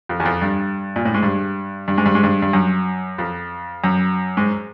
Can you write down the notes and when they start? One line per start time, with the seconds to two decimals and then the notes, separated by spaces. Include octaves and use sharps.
0.09 F2
0.20 E2
0.25 F2
0.42 G2
0.96 A#2
1.05 A2
1.14 G#2
1.23 G2
1.88 G2
1.98 G#2
2.06 G2
2.15 G#2
2.23 G2
2.42 G2
2.53 F#2
3.18 F2
3.84 F#2
4.37 G#2